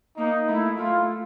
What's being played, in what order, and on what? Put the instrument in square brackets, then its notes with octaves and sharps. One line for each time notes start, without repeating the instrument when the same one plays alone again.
[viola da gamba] A#3 [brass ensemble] D#4
[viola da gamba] A3 [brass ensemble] E4
[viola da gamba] A3 [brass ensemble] F4